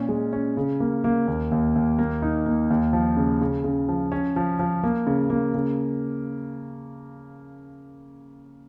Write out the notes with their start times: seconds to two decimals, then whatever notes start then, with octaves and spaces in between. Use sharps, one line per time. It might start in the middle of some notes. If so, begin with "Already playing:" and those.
Already playing: A#2 C#4
0.08 G#3
0.33 C#4
0.57 C#3
0.80 A#3
1.04 A#3
1.28 D#2
1.52 D#2
1.75 D#2
1.99 A#3
2.22 D#4
2.46 A#3
2.70 D#2
2.93 F3
3.17 C#3
3.41 C#3
3.64 C#3
3.88 F3
4.12 C#4
4.36 F3
4.59 F3
4.83 A#3
5.07 C#3
5.30 A#3
5.54 C#3